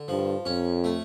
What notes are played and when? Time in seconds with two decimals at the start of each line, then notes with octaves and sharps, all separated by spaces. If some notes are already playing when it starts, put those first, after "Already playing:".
Already playing: D3
0.08 G2 F3
0.45 F2 C#4
0.84 A3